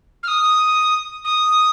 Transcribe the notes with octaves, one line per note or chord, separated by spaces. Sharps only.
F6
D#6
D#6